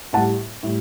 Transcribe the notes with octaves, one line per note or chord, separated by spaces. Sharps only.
A2 G3 F#5 A5
A2 G3